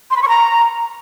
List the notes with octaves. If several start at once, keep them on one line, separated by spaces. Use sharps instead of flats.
C6
B5
C#6
A#5